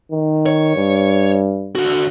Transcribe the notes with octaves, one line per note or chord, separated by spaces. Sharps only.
D#3
C#5
G2
D3 F#4